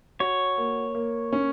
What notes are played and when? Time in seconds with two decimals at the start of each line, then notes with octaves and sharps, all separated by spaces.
0.20 F#4 C#5
0.58 A#3
0.95 A#3
1.33 C#4